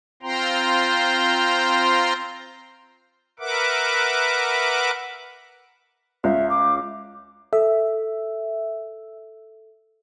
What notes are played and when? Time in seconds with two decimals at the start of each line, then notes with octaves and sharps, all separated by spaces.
0.23 C4 F4 C5 G5 A#5 C6
3.39 A#4 B4 E5 F#5 D6
6.24 C#2 E5
6.50 D6
7.53 A4 E5